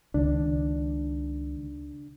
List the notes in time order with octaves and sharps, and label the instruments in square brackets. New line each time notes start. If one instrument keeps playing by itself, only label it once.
[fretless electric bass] C#2 D#3 [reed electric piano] D4